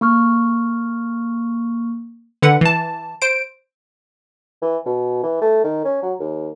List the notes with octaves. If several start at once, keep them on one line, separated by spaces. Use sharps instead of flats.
A#3 C#6 F6
D3 B4 F#5
E3 A5
C5 D7
E3
B2
E3
A3
D#3
C#4
F#3
D#2